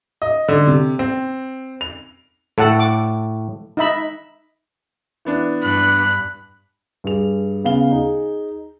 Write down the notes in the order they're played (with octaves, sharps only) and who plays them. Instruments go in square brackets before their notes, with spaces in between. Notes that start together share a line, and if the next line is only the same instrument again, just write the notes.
[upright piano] D#5
D3
C3
C4
F7
[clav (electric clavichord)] A2 [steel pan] A4 F#5 A5
[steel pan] D6
D#4 E5 B5
[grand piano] E3 B3 D4
[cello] G2 [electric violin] B5 F#6
[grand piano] G2 G#4 F7
C#3 B3 F5 G7
D#4 G#4